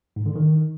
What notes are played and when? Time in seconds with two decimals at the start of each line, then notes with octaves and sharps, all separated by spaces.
0.16 G#2
0.26 D3
0.36 D#3